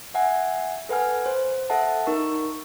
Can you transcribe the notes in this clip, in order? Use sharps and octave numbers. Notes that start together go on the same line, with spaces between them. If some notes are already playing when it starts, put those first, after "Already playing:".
E5 F#5 G#5
A4 B4 F#5 G#5 F6
C5
A4 E5 F#5 A5
D#4 A#4 C#6